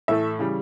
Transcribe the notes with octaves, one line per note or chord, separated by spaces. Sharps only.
A2 E3 A3 E5
C#3 E3 G3